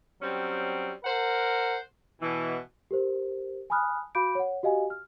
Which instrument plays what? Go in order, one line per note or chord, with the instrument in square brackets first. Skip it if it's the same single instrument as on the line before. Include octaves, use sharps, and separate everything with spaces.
[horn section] F#3 G3 C4 C#4
A#4 C5 F#5
B2 E3
[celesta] G4 A#4 C5
G#5 A5 B5 D#6 F6 F#6
F#4 F5 B5 D6 G6 D7
C#5 F#5
F#4 G4 D#5 F5 G#5
F6